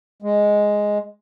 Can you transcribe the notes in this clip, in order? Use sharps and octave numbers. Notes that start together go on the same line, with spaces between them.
G#3